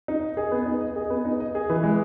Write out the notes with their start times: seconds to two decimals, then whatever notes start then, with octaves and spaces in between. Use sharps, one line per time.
0.08 D#4
0.23 D#5
0.37 G#4
0.52 B3
0.66 D#4
0.81 D#5
0.96 G#4
1.10 B3
1.25 D#4
1.40 D#5
1.55 G#4
1.70 E3
1.84 G#3